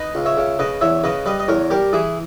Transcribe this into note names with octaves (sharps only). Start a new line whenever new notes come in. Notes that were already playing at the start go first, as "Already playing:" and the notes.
Already playing: D#4 B4 D#5
C#2
C#5 E5
C#3
C#3 B4 D#5
E2 C#5 E5
C#3 B4 D#5
G3 B4 D#5
D#5
E2 A#4 C#5
G3 G4 A#4
E3 E4 G#4